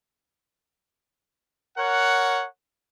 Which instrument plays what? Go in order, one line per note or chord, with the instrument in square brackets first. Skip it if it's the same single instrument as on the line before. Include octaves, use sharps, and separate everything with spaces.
[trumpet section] A#4 C#5 F#5